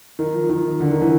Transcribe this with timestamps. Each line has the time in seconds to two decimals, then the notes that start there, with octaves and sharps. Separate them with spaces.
0.19 D#3
0.34 F3
0.50 D#3
0.80 D3
0.91 D#3
1.02 E3